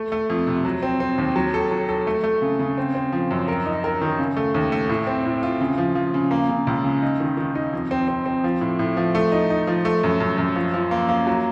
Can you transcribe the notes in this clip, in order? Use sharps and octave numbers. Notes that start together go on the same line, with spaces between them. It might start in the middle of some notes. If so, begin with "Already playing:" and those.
Already playing: A3
A3
F2
C3
F#3
C4
C4
D#2
F#3
A4
F#3
A4
A3
A3
C#3
C#3
C4
C4
F3
F#2
A#4
D#4
A#4
D#3
C#3
A3
D#2
A3
A2
C4
A2
F4
C#3
F3
F3
C#3
A#3
C#3
C#2
C#3
D#4
D#3
D#3
D#4
F2
C4
C4
C4
F3
A2
A2
F3
A3
D#4
D#4
F3
A3
F#2
F#2
F#2
F3
F3
A#3
A#3
F#3